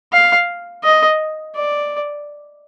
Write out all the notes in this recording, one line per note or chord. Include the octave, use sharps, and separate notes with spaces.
F5
D#5
D5